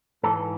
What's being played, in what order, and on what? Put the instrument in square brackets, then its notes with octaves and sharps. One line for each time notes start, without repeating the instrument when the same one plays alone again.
[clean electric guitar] G#2 E3 A4